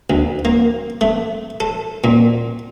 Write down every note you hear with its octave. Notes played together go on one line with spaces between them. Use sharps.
D2
A#3
A3
A4
A#2